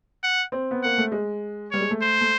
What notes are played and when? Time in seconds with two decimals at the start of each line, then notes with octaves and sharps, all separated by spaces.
0.23 F#5
0.52 C4
0.71 B3
0.83 A#3 F#5
0.98 A3
1.12 G#3
1.71 G3 C#5
1.81 G#3
1.91 A3
2.01 C5
2.21 A3